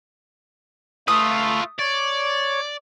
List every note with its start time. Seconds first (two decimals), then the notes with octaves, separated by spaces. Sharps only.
1.08 A3 F4 B4 D#6
1.79 C#5 D5